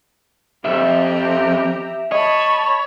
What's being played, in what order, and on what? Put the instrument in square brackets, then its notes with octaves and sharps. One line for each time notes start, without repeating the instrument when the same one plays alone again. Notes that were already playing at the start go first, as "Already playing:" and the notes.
[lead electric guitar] B1 F2 [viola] G4 A#5 [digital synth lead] E5
[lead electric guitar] C#5 [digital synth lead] D#5 [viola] A5 B5